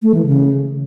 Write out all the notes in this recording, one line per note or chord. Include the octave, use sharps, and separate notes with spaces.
A3
E3
C#3